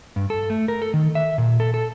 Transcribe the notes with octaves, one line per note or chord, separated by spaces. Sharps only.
G2
A4
A3
A#4
A4
D#3
E5
A#2
A4
A4